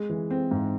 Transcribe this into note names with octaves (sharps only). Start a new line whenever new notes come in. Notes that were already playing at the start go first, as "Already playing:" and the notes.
Already playing: G#3
E3
C4
G#2